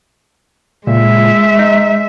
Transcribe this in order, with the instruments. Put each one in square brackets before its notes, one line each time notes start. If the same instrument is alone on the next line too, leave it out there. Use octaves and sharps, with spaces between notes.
[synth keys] C#2 A#2 [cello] G#3 E5
[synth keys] D#4